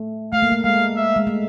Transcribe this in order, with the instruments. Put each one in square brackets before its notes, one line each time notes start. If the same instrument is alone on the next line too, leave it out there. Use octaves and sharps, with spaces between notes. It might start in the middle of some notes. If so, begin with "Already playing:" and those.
Already playing: [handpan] A3
[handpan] A3 [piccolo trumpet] F5
[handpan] A#3
A3
[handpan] G#3 [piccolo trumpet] F5
[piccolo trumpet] E5
[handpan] G#3
A3